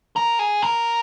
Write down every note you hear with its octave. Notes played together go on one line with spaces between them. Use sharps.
A#4
G#4
A#4